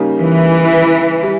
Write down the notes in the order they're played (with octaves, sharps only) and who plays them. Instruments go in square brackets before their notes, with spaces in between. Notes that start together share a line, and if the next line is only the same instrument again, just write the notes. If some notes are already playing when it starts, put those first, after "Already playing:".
Already playing: [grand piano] C#3 G3 A#3 D#4
[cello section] E3
[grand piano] G3